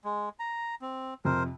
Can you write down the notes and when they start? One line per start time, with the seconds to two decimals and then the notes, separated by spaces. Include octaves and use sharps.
0.04 G#3
0.39 A#5
0.82 C4
1.25 F2 C3 A#4 C5